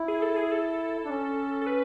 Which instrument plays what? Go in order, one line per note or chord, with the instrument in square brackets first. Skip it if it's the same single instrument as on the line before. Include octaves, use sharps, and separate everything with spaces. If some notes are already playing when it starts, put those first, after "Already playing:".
Already playing: [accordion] E4
[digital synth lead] G#4
A4
G#4
A4
[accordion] D4
C#4
[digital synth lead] A4
B4